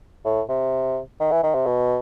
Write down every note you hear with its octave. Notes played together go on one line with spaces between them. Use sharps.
A2
C3
D#3
E3
D#3
C3
B2